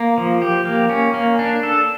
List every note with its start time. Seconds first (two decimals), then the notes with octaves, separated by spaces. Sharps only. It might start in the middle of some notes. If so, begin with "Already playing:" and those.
Already playing: A#3
0.18 F3
0.42 G4
0.65 A#3
0.90 C#4
1.14 A#3
1.39 D4
1.63 A4